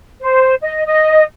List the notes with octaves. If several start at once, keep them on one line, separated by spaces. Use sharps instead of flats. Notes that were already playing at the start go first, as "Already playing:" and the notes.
C5
D#5
D#5